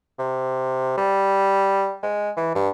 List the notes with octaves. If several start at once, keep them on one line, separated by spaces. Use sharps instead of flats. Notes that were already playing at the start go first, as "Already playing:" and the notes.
C3
G3
G#3
E3
G2